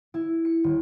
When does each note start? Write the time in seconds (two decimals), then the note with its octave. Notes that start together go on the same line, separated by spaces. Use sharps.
0.14 E4
0.45 C#7
0.64 D#1